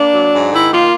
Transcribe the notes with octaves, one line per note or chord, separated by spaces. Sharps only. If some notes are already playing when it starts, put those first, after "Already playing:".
Already playing: A#3 D4
F#3
G#2
D#3 E4
A#3 F4